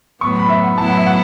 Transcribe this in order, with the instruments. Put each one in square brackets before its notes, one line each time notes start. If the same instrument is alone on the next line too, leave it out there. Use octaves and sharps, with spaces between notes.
[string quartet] A2 F#3 B3 [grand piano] C#6
[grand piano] B5
E5
F#5
[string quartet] A2 F#3 B3 E4 [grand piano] A5
[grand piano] F#5
E5
F#5